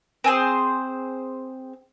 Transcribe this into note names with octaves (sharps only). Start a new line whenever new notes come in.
C4 G#4 C5